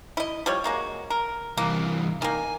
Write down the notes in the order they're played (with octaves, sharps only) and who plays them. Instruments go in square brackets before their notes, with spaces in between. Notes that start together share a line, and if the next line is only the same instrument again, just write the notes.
[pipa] E4 D#5
F3 G3 C#5
G#3 A#3 F#4
A#4
[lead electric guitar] C2 E3 [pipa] A#3
[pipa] D#3 A#3 [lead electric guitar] G#5